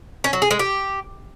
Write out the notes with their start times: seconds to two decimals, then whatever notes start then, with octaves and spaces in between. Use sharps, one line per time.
0.24 C#4
0.33 F#3
0.42 G#4
0.51 G#3
0.59 G4